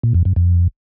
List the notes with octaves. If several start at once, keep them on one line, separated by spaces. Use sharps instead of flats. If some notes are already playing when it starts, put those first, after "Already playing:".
A#2
F2
F#2
F2